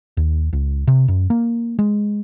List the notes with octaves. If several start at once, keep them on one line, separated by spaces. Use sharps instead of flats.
D#2
C#2
C3
F#2
A#3
G#3